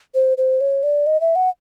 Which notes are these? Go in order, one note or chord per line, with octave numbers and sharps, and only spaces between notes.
C5
C5
C#5
D5
D#5
E5
F#5